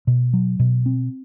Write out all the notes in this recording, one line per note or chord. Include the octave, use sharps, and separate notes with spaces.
B2
F#3
B2
C4